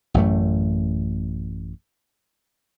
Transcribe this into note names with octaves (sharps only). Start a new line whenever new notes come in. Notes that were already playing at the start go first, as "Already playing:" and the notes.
A1 F#2 A3